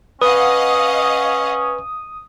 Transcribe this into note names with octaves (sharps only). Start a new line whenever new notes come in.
C#4 B4 D#5 F5 F#5 D#6